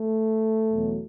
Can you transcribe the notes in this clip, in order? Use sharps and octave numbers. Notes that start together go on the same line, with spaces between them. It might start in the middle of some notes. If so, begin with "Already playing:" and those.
Already playing: A3
E2 B2 F#3